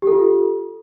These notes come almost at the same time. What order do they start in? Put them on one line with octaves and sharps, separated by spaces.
G4 A4 F4